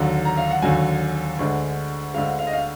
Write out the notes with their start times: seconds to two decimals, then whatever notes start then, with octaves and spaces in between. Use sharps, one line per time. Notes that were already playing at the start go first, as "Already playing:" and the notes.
Already playing: D#2 D3 F#3
0.25 A#5
0.37 F5
0.51 F#5
0.62 D#2 D3 F#3 G#5
1.39 D2 D3 G#3
2.14 D2 D3 G#3 F5
2.39 F5
2.47 D#5
2.53 F5